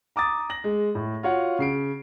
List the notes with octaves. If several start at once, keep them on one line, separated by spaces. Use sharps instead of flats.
A#5 D6 D#6 A6
A#6 F#7
G#3
A2
F4 F#4 C#5 F5 F#5
C#3 C7 D7